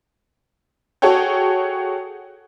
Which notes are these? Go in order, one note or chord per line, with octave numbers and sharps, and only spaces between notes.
F#4 G#4 A4 C#5 G5